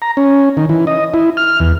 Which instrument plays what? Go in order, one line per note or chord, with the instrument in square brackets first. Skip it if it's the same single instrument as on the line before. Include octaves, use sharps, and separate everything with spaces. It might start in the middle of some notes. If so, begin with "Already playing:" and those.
[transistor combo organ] A#5
C#4
D#3
E3
D#5
E4
F6
E2